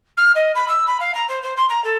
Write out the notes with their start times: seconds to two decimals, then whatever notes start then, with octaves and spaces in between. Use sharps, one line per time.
0.17 F6
0.35 D#5
0.55 B5
0.68 E6
0.87 B5
1.00 F5
1.14 A#5
1.28 C5
1.42 C5
1.56 C6
1.68 A#5
1.84 A4